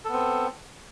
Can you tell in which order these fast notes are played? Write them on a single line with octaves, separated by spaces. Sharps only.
A4 B3 C4